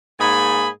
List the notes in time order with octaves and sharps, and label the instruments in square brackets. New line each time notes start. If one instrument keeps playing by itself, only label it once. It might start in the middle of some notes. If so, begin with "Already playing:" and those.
[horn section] G#2 A#3 G#4 G#5 B5